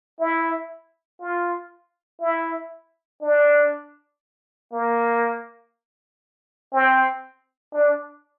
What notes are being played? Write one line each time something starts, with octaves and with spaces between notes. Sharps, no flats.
E4
F4
E4
D4
A#3
C4
D4